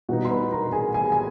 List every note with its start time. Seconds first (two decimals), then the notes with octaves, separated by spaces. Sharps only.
0.09 B2 G3 B3 D#4 F#4 F#5
0.25 C6
0.30 B4 B5
0.52 A#4 A#5
0.72 G#4 G#5
0.94 G#4 G#5
1.12 G#5